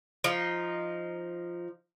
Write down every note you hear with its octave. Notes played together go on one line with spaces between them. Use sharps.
F3 D#4